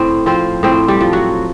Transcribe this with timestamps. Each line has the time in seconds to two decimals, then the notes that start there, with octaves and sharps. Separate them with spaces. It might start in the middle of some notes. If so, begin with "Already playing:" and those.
Already playing: A2 C4 C5
0.26 F3 C4 C5
0.63 A2 C4 C5
0.88 G3 G4
1.00 F3
1.13 F#3 F#4